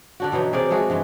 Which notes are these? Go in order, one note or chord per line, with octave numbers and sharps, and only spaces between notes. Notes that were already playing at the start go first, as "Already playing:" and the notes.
D3 D4 F#4
B2 E3 F#3 D#4
C3 G#4 A#4 D5
G#3 A3 F#4 G#4
G2 E3 G#3